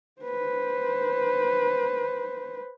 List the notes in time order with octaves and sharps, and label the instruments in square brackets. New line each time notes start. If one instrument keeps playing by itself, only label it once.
[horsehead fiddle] B4 C5